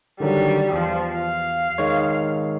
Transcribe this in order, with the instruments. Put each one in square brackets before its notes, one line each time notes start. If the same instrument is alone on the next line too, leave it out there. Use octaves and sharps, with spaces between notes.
[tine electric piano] D3 D#3 F#3 [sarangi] G3
[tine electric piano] E2 [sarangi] F3
[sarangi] F5
[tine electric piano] D#3 G#3 C#5